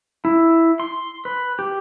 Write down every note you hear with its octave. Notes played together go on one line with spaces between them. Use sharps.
E4
C6
B4
G4